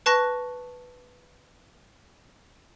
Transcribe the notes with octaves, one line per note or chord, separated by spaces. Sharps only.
B4 A5 C#6 F#6 A#6